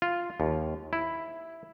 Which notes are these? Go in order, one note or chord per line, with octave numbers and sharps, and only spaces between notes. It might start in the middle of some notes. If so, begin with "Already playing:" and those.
F4
D#2
E4